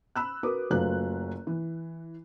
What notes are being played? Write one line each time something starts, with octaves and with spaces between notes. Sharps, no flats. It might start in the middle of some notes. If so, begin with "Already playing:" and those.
B5 E6 F#6
F#4 A#4 B4 D6 D#6
F#1 F#3 A3 F4 B4 F#6
E3